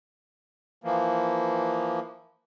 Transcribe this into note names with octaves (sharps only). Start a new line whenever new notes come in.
E3 F3 A#3